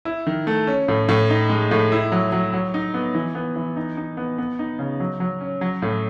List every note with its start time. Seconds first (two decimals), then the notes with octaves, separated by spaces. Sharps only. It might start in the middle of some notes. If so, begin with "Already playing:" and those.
0.05 E4
0.27 D#3
0.47 A3
0.67 C#4
0.88 A2
1.09 A2
1.30 D#4
1.50 G#3
1.71 A2
1.92 E4
2.12 F#3
2.32 F#3
2.53 F#3
2.74 D#4
2.94 B3
3.15 E3
3.35 B3
3.56 E3
3.76 D#4
3.97 D#4
4.17 B3
4.38 B3
4.59 D#4
4.79 C#3
5.00 F#3
5.20 F#3
5.41 C#4
5.61 F#3
5.82 A2